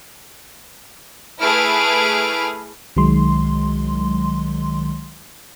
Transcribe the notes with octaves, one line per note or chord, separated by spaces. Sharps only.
A3 E4 G#4 B4 F6 D7
C2 D#3 F#3 G#3 C6